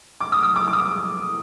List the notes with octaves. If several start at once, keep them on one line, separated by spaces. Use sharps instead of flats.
D6
D#6
D#6
D6
D6
D#6